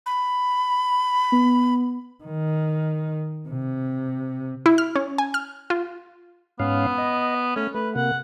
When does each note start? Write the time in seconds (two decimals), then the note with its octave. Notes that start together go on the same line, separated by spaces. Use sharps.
0.06 B5
1.32 B3
2.24 D#3
3.48 C3
4.66 E4
4.78 F6
4.96 C#4
5.18 G#5
5.34 F6
5.70 F4
6.60 G#2 B3 C#4 F5
6.98 D#5
7.56 A3 C#4
7.75 A3 B4
7.96 C3 A#3 F#5